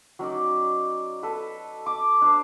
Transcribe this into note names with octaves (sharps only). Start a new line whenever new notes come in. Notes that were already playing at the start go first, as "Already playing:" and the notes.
F#3 C#4 D#4 D5
A4 B4
D6
D4 C5